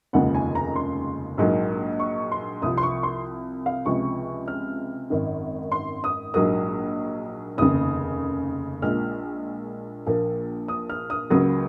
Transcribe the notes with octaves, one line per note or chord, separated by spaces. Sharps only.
F1 D#2 C#3 F3 G#3 F#5
G#5
A#5
C6
A#1 G#2 F#3 A#3
C#6
C6
C2 C3 F3 D#6
C6
C#6
C6
F5
C#2 C3 F3 G#3 C#6
F6
G#1 F#2 D#3
C6
D#6
A#1 G#2 F#3 A#3 D#6
F1 D#2 C#3 D#6
A#1 A#2 G#3 F6
A#1 A#2 F3 A#3
D#6
F6
D#6
C#2 C#3 F#3 A#3 D#6